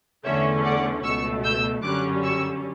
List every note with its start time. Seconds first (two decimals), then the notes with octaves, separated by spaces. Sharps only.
0.24 E2 D3 A3 C#4 C#5 E5
0.65 D5 F#5
1.04 C#2 B2 A3 C#6 E6
1.44 E6 G6
1.83 F#2 D3 G3 C#4 D6 F#6
2.23 C#6 E6